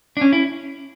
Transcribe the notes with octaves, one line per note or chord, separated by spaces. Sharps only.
D4
C#4
E4